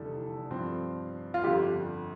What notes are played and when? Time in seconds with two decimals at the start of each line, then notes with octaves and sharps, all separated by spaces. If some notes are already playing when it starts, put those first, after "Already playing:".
Already playing: F1 E2 D3 G3 A4
0.50 G2 F3 C4
1.34 F4
1.44 G1 F2 D3 G4